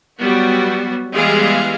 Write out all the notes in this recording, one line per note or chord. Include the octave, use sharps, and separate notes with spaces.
F#3 G3 B3 F#4
E3 G3 G#3 B3 G#4 F5